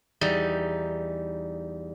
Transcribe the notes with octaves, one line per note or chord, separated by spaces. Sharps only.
E2 G3 D#4